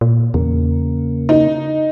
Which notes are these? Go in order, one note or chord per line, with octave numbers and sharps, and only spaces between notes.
A#2
E2 C#3 A#3
D#4